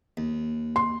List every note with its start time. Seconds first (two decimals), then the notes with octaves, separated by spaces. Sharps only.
0.17 D#2
0.76 C6